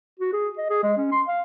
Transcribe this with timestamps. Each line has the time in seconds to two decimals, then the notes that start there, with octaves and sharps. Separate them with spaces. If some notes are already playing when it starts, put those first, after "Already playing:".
0.20 F#4
0.33 G#4
0.58 D#5
0.70 G#4
0.83 G#3
0.97 C#4
1.12 C6
1.28 F5